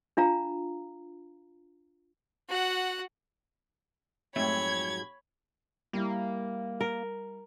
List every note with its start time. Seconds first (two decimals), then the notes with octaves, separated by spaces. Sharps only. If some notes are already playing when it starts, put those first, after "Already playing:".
0.17 D4 F4 F5 A#5
2.48 F#4 F#5
4.36 F2 G#2 F#3 A3 C#5 G5 B5 G#6
5.93 G3 A#3 E4
6.81 A#4